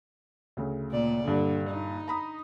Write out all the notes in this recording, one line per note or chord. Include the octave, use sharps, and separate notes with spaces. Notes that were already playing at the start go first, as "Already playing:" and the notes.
D2 C#3
A#2 D5
G2 A#2 D3
D#4
A#5 B5 D#6